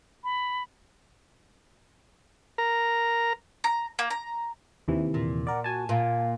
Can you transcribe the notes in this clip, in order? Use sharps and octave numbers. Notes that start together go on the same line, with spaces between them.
B5
A#4 A#5
A#5
A#3
A#5
D#2 C3 E3
A#2
A#4 D5 F#5
F#4 G#5 A5
A#2 F5